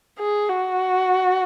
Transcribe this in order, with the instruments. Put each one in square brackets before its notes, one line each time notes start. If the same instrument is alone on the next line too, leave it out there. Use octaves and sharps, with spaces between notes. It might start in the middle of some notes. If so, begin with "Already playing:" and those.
[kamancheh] G#4
F#4